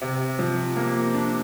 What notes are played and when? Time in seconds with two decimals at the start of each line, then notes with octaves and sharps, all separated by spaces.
0.01 C3
0.39 F3
0.77 A#3
1.14 D4